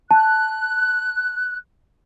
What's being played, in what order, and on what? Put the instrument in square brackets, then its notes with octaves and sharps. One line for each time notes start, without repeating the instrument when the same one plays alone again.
[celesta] A5 [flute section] F#6